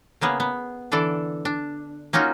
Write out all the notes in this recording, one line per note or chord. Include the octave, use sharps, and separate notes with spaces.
C#3 A#3 B3 G#4
B3
D3 E3 D4 A4 D5
D4
A#3 C#4 D#4 F4 F#4